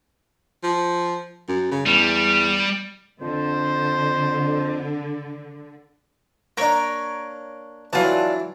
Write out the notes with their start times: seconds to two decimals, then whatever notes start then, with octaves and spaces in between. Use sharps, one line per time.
0.63 F3
1.48 F#2
1.71 C#3
1.86 E2 G3
3.21 F2 D3 C5
6.57 A#3 D4 A#4 C#5
7.93 E3 F#3 D4 F4 A5